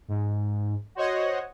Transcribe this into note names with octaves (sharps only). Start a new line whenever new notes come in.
G#2
F#4 C5 C#5 D#5 F#5